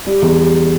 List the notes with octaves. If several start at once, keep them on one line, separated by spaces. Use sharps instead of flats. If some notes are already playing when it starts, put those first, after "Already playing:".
G3
E2
G3